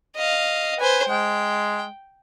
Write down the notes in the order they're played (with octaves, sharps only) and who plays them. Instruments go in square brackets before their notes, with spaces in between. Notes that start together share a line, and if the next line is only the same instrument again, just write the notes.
[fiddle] D#5 F5
[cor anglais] B4 [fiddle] C5 G#5
[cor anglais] G#3 [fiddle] G5